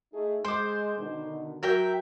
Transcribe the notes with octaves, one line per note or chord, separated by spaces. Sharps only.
A3 D#4 G#4
G#3 C5 C6 D6
B2 D3 D#3
F#3 A#4 E5 G5